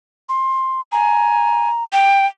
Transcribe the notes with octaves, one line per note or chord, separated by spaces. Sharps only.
C6
G#5 A#5
G5